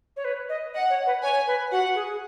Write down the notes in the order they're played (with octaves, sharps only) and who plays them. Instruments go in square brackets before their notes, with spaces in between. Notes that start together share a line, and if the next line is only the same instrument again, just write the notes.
[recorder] C#5
B4
D#5
[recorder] D#5 [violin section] F#5
[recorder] C#5
B4
[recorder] C#5 [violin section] G#5
[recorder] B4
[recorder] F#4 [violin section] F#5
[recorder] G#4